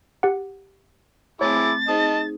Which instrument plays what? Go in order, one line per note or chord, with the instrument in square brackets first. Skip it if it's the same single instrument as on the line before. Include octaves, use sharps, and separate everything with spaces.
[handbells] G4 F#5
[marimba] A3 C4 [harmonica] E4 G#4 D6 [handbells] C#5 [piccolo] A6
[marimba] D#4 G#4 C5 [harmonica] D#5 A5